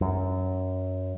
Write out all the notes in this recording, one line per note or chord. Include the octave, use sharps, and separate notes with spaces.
F#2